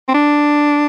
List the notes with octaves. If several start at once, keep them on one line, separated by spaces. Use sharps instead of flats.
C4
D4